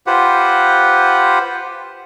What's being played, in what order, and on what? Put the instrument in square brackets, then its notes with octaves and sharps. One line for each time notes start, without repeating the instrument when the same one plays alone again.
[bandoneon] F4 G4 B4 C5 F#5